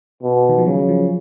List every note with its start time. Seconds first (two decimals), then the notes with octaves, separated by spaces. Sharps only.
0.23 B2
0.49 D#3
0.58 F3
0.67 C#3 F#3
0.79 F#3
0.89 F3